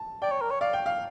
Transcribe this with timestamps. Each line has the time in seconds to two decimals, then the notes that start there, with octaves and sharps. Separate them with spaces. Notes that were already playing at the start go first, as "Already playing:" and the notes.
Already playing: A5
0.22 D5 G5
0.31 C#5
0.41 A#4
0.51 C#5
0.61 D5 F5
0.73 G5
0.86 F5